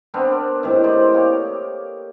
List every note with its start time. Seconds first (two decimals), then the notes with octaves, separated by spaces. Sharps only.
0.14 B3 C4 D4 A#4
0.63 A2 C3 D#3
0.84 D#4 C5 D5
1.12 A#3 G4 C#5